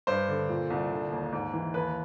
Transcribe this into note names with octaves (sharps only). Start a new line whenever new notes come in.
G2 C5
D3
A#2
C2
D3
D#2
G#2
E3
D#2 B4